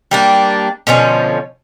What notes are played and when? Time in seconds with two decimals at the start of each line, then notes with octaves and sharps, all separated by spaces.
0.11 G3 A#3 D4
0.87 B2 D3 F3 C#4